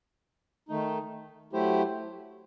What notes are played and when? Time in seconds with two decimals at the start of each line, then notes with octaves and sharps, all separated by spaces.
0.69 D#3 A3 D#4
1.53 F#3 A3 E4 G4 C5